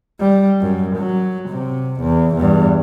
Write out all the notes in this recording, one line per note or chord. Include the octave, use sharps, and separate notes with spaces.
G3
F#2
F#3
C3
E2
E2 G2